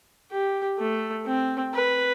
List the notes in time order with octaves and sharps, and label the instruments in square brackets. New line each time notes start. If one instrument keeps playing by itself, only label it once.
[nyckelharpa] G4
A3
C4
B4